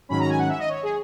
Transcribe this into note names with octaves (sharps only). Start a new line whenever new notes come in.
G#2 D#3 F#3 C#4 B5
A#5
G#5
F#5
E5
D#5
C#5
G#4